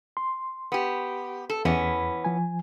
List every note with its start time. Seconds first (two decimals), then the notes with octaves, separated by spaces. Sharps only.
0.17 C6
0.72 B3 G4
1.50 A4
1.65 E2 E3 B3 C#4
2.25 F3 G#5